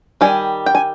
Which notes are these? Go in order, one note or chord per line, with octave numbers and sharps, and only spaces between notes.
D#3 G3 G#5
G5
G#5